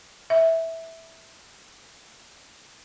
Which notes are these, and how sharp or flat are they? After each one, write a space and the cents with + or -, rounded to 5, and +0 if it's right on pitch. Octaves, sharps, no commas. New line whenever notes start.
E5 -10